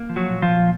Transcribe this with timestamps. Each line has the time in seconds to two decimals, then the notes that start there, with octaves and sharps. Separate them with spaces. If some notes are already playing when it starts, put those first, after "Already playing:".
Already playing: A#3
0.09 F3
0.16 F#3 F#4
0.30 A#2
0.42 F3 F4
0.48 A#2